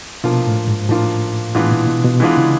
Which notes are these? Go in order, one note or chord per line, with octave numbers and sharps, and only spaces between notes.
B2 F3 A#3 D4 F4
A2
G#2
A2 F3 A#3 D4 F4
A2 E3 G#3 B3 D4 F4
A#2
B2
B2
E3 G#3 B3 D4 F4
C#3